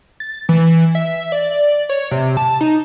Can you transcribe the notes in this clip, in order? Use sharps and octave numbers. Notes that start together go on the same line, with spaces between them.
A6
E3
E5
D5
C#5
C3
A5
D#4